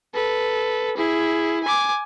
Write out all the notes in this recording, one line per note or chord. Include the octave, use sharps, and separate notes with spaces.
A4 B4
E4 G#4
G#5 D6